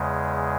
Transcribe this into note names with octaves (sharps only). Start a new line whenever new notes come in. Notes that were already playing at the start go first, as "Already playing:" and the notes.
Already playing: E2 C#3 G#3